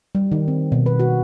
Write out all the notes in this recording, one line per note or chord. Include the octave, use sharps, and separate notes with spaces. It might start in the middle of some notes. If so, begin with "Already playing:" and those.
G3
D#3
C4
B2
B4
F#4